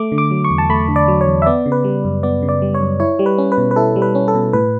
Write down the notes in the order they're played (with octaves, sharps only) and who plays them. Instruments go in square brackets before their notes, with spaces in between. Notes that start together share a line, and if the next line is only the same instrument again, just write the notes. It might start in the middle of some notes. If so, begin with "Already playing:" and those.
Already playing: [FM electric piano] A3 D6
D3
D6
F#3
C#6
E2
A5
A3 B5
D3
D5
F#3
C#5
E2
E5
B3 D5
C#3
B4
G3
F#2
B3 D5
C#3
D5
G3
C#5
F#2
E4 C#5
G3
B4
C#4
B4
B2
B4
E4 A4
G3
B4
C#4
A4
B2
A2 B4